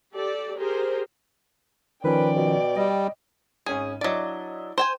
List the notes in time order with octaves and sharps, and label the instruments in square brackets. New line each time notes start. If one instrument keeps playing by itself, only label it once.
[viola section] G4 A4 D5
G4 G#4 A#4 C5
[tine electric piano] D#3 F3 C#4 [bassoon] B4 [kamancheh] D5 G5
[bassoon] B2
[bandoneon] G3 [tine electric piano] D#5
[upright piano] G#1 C#4 D#7 [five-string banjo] G#4
[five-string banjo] F#3 D5 [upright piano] D4 E4 D#5
[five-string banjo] C5 G5 G#5